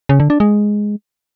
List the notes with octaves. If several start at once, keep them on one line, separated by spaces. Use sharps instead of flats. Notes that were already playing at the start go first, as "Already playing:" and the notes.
C#3
D3
D4
G#3